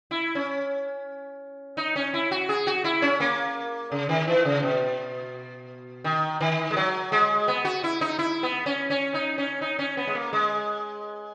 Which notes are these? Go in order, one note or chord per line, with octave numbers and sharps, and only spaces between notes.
E4
C#4
D#4
C#4
E4
F#4
G#4
F#4
E4
C#4
A#3
C#3
D#3
E3
C#3
B2
D#3
D#3
G#3
F#3
G#3
B3
F#4
E4
D#4
E4
B3
C#4
C#4
D#4
C#4
D#4
C#4
B3
G#3
A#3
G#3